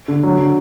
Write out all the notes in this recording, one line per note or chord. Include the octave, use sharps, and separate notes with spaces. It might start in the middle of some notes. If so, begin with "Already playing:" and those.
D3
F#3
D3